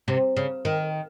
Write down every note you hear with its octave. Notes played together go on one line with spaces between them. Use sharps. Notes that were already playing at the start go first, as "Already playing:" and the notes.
C3
C#3
D#3